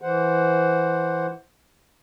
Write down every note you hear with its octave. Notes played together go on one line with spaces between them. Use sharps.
E3 C5 F#5